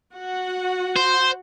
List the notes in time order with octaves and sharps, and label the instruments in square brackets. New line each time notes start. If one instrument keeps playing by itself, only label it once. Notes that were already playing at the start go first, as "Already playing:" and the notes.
[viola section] F#4 F#5
[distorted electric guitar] C5